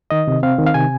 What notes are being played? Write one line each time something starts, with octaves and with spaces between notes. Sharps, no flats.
D#3 D#5
C3
C4 F5
D#3
F5
C3 G#5